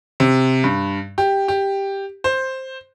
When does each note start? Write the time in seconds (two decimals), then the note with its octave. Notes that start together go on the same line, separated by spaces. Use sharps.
0.20 C3
0.64 G2
1.18 G4
1.48 G4
2.24 C5